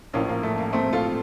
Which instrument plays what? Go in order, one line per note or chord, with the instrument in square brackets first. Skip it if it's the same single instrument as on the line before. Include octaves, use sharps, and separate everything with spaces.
[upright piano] A#1 A2 F3 A#3 C#4
A#3
A3
A#3
A3 C4
F4 A4